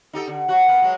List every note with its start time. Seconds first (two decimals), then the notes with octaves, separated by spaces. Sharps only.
0.13 D#4 G4 A4
0.28 D3
0.48 F#3 F#4
0.67 A#3 B3
0.82 F#3 G#3